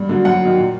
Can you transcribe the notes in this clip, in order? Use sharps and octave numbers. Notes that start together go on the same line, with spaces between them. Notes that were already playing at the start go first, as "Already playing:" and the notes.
Already playing: G2
D3 F#3
F#2 F#5
D#3 F#3
A#2